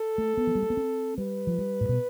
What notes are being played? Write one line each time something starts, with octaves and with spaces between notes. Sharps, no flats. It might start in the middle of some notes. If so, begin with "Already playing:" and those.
Already playing: A4
A3
B3
F3
G3
A3
B3
C4
G3 B4
F3
G3
A2
B2